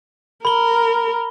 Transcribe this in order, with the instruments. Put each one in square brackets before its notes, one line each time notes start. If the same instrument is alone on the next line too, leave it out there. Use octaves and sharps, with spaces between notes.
[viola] A#4 [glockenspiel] B5 G7